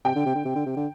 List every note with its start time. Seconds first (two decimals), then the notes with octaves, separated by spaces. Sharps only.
0.05 C3 G5
0.15 D3
0.25 C3
0.35 D3
0.45 C3
0.55 D3
0.66 C3
0.76 D3